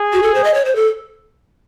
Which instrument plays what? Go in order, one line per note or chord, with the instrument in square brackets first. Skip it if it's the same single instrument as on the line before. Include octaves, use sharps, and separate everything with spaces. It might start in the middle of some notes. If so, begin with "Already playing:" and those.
Already playing: [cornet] G#4
[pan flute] F#4
A4
C5
D#5
C#5
C5
A4